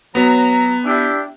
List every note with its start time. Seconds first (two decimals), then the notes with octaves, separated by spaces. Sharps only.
0.15 F#3 B3 A#5
0.84 D4 E4 G4